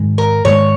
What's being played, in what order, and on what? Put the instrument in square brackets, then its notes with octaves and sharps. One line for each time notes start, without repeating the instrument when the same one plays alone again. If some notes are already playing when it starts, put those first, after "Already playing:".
Already playing: [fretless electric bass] G#2 D#3 G#3
[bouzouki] A#4
[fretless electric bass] G#2 D#3 G#3 [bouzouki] C#5